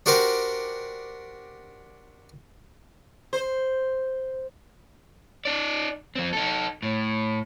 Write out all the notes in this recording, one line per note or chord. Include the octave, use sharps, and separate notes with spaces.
D4 F#4 G4 A#4 C5 D6
C5
D#4 D5
F3 C4
D#4 A4
A2